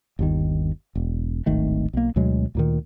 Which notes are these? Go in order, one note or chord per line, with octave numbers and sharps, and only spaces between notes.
G1 D#2 D#3
E1
D1 G#1 D#3 A3
B1 A#3
D2 B2 F#3 G#3
D2 A#2 D#3